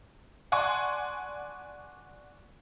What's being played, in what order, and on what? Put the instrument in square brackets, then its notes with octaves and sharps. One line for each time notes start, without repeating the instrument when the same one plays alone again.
[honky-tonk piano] D5 F#5 G#5 A5 C6 C#6